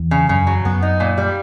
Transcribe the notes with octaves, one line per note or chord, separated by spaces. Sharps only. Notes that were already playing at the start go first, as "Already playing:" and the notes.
Already playing: E2
C#3
F#2 C#3
F#3
F#2 B3
D#4
A#2
G3